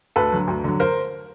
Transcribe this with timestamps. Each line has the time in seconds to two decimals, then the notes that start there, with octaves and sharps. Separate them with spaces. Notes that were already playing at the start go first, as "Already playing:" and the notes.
0.16 D2 A4 B4
0.32 D3 F#3
0.48 D2
0.64 D3 F#3
0.80 A#4 C5